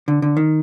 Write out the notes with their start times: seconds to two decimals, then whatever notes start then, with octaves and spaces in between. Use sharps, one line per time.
0.08 D3
0.22 D3
0.37 D#3